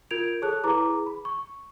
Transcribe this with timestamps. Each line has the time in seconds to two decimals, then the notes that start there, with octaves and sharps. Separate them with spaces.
0.11 F4 A#4 G6 G#6 D7 F7
0.42 G#4 A4 C#5 A5 F#6
0.63 E4 G#4 B4 A#5 D6
1.06 B5
1.25 C#6